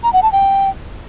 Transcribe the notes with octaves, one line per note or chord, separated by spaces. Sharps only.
A#5
F#5
A5
G5